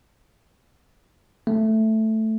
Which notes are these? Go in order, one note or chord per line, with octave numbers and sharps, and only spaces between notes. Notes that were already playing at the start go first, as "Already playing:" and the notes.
A3